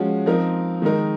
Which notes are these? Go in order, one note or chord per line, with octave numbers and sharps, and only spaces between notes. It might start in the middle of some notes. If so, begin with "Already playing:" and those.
Already playing: F3 G#3 C#4 F#4
F3 C4 D#4 A#4
D#3 G#3 D#4 A#4